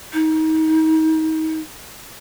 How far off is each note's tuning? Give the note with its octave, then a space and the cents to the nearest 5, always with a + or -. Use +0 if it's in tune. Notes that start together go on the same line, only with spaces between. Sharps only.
D#4 +30